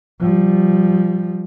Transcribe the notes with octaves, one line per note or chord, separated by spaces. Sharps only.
F3 G3